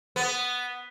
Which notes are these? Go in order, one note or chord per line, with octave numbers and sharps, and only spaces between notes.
B3